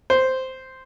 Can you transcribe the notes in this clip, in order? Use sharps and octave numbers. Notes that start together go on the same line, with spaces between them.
C5